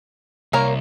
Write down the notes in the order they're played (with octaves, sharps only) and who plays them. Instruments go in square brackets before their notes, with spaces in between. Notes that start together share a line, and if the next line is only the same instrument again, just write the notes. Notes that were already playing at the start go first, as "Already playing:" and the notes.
[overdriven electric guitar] C2 [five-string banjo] A#3 A#4 C#5